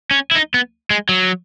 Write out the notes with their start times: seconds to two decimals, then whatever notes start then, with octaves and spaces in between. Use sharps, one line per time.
0.11 C#4
0.31 E4
0.35 D#4
0.54 B3
0.90 G#3
1.09 F#3